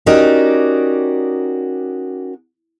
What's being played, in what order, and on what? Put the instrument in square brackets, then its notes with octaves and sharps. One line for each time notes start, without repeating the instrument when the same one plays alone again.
[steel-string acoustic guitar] C#4 D#4 F#4 G4 A#4 D5